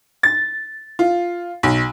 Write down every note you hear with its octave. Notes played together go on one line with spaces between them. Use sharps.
A6
F4
B1